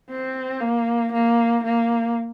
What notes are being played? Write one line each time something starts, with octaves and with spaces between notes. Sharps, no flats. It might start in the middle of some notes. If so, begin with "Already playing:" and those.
C4
A#3
A#3
A#3